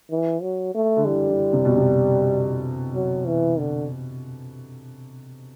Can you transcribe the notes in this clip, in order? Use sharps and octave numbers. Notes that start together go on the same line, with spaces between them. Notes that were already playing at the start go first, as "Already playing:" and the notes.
E3
F#3
A3
D3
E3 G3
E3
C3
B2
C3
F#3
E3
D3